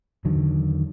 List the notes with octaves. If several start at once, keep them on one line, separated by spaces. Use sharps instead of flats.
E2 D3 D#3 F#3